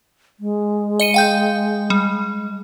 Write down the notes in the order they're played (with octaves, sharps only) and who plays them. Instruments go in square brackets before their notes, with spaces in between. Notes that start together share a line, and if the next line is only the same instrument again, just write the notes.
[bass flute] G#3
[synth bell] D#5 C#7 D#7
F5 G5 G6
G3